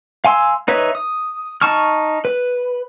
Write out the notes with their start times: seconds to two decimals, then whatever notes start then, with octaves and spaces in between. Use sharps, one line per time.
0.25 F5 G#5 C6 E6
0.68 D#4 B4 C#5 E5
0.95 D#6
1.61 D#4 A5 C#6 F6
2.25 B4